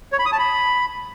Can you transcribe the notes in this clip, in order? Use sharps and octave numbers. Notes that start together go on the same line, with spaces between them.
C#5
B5
D#6
A5
B5